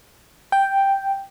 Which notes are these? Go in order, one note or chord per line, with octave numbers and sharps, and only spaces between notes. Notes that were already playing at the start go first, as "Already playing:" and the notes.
G5